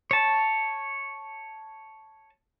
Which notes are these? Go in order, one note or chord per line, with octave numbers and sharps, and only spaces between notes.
C#5 A5